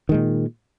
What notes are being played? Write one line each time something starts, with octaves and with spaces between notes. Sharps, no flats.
A#2 D#3 G#3